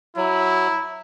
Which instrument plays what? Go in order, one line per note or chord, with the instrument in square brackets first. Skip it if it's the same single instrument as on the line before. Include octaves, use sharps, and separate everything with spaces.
[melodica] F#3 [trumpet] E4